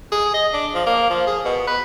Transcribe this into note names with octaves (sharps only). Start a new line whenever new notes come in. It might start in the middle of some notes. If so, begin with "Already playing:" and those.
G#4
D#5
D4
F3
A#3
F3
G#4
B2
B4